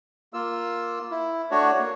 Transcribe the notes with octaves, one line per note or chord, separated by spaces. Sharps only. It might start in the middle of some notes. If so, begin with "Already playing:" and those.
A#3 F4 E6
E4
A3 D4 F#4 C#5
A#3